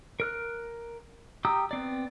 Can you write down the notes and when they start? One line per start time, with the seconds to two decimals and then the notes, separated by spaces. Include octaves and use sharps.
0.20 A#4 F6 F#6
1.45 G4 G5 A#5 D#6 E6
1.71 B3 C4 D5